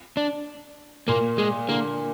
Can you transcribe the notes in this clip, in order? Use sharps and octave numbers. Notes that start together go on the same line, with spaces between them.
D4
A#2 A#3
G#3
D3 A#3